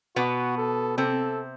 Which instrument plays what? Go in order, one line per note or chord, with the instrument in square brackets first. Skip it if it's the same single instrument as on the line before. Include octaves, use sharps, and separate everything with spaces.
[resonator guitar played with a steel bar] B2 B3 [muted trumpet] F#4
[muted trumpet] A4
[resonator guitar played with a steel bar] C3 C4 [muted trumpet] A4